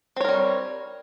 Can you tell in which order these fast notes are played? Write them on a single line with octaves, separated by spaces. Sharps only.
C4 C#5 A#4 G3